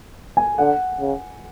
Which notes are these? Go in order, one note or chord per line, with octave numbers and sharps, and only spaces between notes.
G#5
D3 F#5
C#3